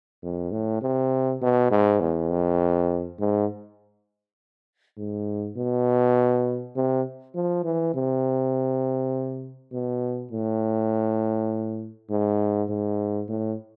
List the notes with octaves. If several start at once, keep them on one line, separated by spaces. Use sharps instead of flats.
F2
A2
C3
B2
G#2
E2
F2
G#2
G#2
B2
C3
F3
E3
C3
B2
A2
G#2
G#2
A2